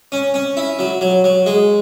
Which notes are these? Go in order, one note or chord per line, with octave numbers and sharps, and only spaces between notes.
C#4
C#4
E4
F#3
F#3
F#3
G#3